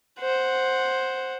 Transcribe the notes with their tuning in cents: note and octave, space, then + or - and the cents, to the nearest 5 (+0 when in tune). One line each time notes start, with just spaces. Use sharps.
C5 +5 F#5 +0